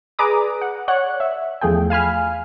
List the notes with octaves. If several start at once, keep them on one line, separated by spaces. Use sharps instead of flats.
G#4 B4 D5 A#5 D6 D#6
F#5
C#5 D5 F#5 F#6
E5
E2 F3 A3 G#4 G5
F5 G#5 B5 F6